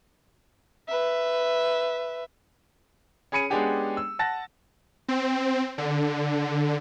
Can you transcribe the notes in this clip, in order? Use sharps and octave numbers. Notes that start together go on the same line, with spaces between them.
B4 E5
C#4 G#4 B5 C#7 D#7
G#3 B3 C#4 D4 G4 G#4
E6
F#5 A5 A6 A#6
C4
D3